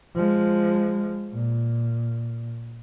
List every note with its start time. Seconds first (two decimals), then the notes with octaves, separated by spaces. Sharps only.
0.15 F3 G#3
1.33 A#2